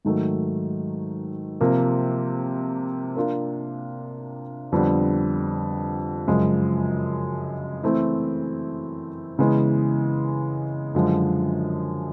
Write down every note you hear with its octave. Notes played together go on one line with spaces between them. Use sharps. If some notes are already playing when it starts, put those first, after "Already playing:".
G#2 D#3 F#3 A3
C3 F3 A#3
A#3 D4 F4 A#4
F2 D3 G3 B3 D4
F#2 C#3 F3 G#3
E3 A3 C4 E4
C#3 E3 G#3 B3
F#2 D3 F3 G#3